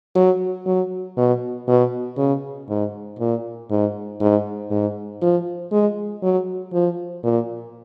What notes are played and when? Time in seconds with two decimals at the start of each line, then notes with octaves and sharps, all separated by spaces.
0.15 F#3
0.66 F#3
1.17 B2
1.68 B2
2.17 C#3
2.69 G#2
3.19 A#2
3.70 G#2
4.21 G#2
4.70 G#2
5.21 F3
5.72 G#3
6.23 F#3
6.73 F3
7.23 A#2